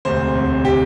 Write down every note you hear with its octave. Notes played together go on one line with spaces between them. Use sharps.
E1 D2 C3 C5
E1 D2 C3
C3 G4